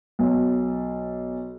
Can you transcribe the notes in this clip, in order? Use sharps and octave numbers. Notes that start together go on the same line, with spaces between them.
B1